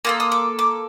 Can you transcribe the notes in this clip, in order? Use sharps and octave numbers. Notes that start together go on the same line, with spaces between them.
A#3 F4 A4 D#6
D#6
D6
D6